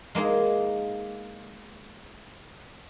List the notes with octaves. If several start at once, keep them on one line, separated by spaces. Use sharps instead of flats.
G#3 A#3 D#4 G#4